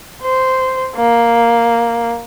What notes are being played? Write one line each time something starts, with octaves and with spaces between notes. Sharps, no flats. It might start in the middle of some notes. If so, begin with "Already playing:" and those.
C5
A#3